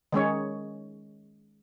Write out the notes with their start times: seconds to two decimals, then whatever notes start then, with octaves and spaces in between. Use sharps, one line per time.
0.12 D#3 G#3 C#4 C#5